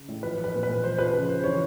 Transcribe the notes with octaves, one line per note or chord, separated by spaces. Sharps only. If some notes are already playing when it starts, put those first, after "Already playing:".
Already playing: C#3
A2
F3 B4
F3
B4
A#2
B4
A#2
F3 C5
F3 B4
C#3 B4
C#3 C5
E3 C#5